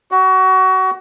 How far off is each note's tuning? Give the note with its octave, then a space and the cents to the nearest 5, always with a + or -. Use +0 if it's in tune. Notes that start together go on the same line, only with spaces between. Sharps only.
F#4 +25